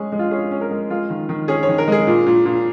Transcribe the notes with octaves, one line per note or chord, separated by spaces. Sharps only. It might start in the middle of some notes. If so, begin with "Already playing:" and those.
Already playing: G#3 C#4 G#4
G#3
F4
C#4 G#4
C#4
A#4
G#3
G#3 F4
D#3
D#3
C#4 G#4
C#5
D#3
A#4
G#3 G#4
A#2
A#2
A#2